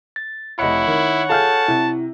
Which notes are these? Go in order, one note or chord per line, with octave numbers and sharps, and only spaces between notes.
A6
F1 E4 C#5 D#5 F#5 B5 C#7
D#3
F4 G#4 A4 F5 A5 F6 G6
C3 E4